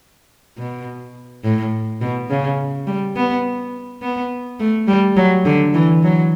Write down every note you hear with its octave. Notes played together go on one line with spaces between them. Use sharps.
B2
A2
B2
C#3
G3
B3
B3
A3
G3
F#3
D3
E3
F#3